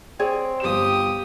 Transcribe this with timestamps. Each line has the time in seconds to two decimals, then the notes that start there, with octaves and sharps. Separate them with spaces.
0.19 C4 G#4 C#5 D5
0.60 G1 G4 D#6 E7